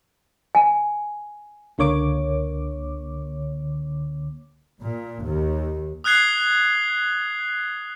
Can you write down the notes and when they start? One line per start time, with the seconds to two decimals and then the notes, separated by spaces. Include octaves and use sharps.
0.55 G#5
1.78 C#2 D3 A#3 C#5 D6
4.81 A#2
5.24 D#2
6.04 D#6 F6 F#6 G#6 C7 G7